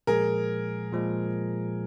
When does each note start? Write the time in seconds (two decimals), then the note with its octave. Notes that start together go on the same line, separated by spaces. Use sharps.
0.07 A#2 F3 G#3 G#4 A#4
0.92 A#2 F3 G#3